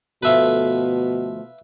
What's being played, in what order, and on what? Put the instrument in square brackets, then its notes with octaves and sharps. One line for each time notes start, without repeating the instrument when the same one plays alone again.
[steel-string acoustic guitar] D2 F3 A3 [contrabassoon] B2 [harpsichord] B4 E5 F5